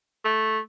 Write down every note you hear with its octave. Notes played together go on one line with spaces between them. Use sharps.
A3